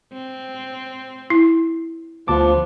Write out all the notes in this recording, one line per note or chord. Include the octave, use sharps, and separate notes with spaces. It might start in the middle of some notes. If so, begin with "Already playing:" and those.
C4
E4
D2 F3 B3 A5 D6